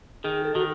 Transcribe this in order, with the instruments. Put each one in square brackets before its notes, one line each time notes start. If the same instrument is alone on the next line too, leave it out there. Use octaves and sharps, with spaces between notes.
[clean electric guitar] D#3 [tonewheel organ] G#4
[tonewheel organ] A4
[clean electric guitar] D#3 [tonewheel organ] F#4